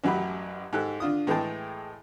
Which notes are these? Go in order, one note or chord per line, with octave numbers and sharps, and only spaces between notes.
A1 F#2 F#3 G4 B5
G#2 G4 A4 F#6
D3 D4 F4 D#6
A2 E3 G#3 G#4 G5 A5